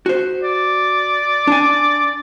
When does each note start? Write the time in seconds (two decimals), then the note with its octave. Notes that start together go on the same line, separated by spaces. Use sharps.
0.06 F#4 C5
0.43 D5
1.47 D4 G#5